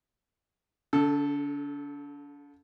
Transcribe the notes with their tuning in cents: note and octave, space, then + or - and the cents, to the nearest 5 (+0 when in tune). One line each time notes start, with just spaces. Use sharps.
D3 -40 A4 +0